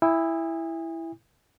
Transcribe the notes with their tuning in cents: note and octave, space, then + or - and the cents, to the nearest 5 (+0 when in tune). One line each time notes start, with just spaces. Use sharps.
E4 +0 G#5 -45 D#6 +0